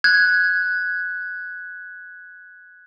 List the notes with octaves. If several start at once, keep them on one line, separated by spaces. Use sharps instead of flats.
F#6 G#6